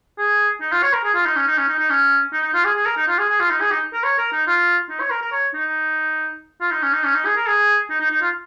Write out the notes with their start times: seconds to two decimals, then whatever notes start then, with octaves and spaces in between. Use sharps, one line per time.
0.18 G#4
0.61 D#4
0.72 F4
0.83 C#5
0.93 A#4
1.04 G#4
1.15 F4
1.25 D#4
1.36 C#4
1.47 D#4
1.58 C#4
1.68 D#4
1.79 D#4
1.90 C#4
2.33 D#4
2.43 D#4
2.54 F4
2.64 G#4
2.75 G#4
2.86 A#4
2.97 D#4
3.08 F4
3.18 G#4
3.29 G#4
3.40 F4
3.50 D#4
3.61 G#4
3.71 D#4
3.93 A#4
4.04 C#5
4.18 A#4
4.32 D#4
4.47 F4
4.89 D#4
5.00 C#5
5.11 A#4
5.22 A#4
5.32 C#5
5.54 D#4
6.61 F4
6.71 D#4
6.82 C#4
6.93 D#4
7.04 C#4
7.14 D#4
7.25 G#4
7.36 A#4
7.47 G#4
7.90 D#4
8.00 D#4
8.10 D#4
8.22 F4